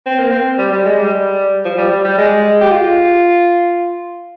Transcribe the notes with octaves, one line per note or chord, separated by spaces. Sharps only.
C4
A#3
C4
G3
G3
G#3
G3
F3
G3
G3
G3
G#3
G4
F4